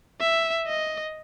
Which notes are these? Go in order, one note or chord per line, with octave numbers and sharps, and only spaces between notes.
E5
D#5